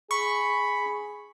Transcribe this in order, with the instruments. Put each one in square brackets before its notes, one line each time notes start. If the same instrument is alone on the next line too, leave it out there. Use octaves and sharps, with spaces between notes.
[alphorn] G#4 [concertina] B5 [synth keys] C#6